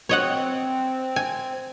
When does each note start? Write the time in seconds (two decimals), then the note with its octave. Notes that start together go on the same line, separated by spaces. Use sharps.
0.09 C4 C#5 D#5 F#5
1.16 G#5